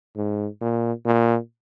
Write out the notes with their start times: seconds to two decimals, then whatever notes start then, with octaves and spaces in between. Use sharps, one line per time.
0.16 G#2
0.61 A#2
1.06 A#2